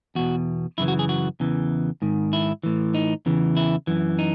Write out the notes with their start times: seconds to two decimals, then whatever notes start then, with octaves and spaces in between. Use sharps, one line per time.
0.15 E2 B2 F#4
0.78 F#2 C#3 E3 E4
0.88 F#4
0.99 G#4
1.09 F#4
1.40 E2 C#3 E3
2.02 G#2 D#3
2.33 E4
2.64 A2 E3
2.94 D#4
3.26 E2 C#3 E3
3.56 E4
3.87 F#2 E3
4.19 D#4